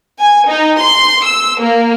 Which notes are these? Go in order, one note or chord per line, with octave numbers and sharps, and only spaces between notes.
G#5
D#4
C6
E6
A#3